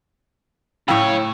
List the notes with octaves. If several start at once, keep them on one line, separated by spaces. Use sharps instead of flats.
A2 C#3 A4 C#5 F5 G5